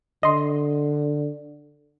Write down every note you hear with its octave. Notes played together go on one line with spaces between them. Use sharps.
D3 D#5 C6